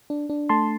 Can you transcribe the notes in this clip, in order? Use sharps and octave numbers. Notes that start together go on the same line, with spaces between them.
D4
D4
A3 A5 C6